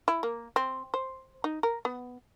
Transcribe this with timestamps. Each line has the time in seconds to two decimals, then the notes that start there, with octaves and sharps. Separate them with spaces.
0.08 E4
0.23 A#3
0.56 C4
0.94 C5
1.44 D#4
1.63 A#4
1.85 B3